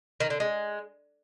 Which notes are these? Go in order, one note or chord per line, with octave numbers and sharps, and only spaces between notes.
D#3
D3
G#3